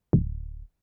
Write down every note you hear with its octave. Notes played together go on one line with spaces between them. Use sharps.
D1